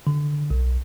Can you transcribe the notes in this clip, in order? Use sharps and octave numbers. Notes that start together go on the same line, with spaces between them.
D3
B1